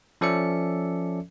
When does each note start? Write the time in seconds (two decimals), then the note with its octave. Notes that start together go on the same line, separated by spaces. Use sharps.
0.21 F3 C#4 A4 D5 E5 C#7